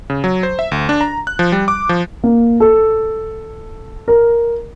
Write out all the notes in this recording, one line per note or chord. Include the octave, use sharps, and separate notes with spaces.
C#3
F#3
C5
E5
D2
D4
A#5
F#6
F3
G3
D6
F3
A#3
A4
A#4